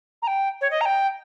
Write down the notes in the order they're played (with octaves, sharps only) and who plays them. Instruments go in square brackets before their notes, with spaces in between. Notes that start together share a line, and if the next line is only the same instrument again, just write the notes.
[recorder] A#5
G5
C#5
D#5
A#5
G5